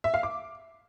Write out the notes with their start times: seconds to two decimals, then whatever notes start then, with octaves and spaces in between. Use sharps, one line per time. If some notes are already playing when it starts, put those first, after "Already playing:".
0.04 E5
0.14 F5
0.23 D6